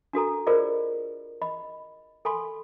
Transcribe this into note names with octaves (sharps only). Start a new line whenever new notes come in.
D4 F#4 A4 A#5
F4 G#4 A#4 C5 D5 D#5
D#5 B5
A4 G#5 B5 C6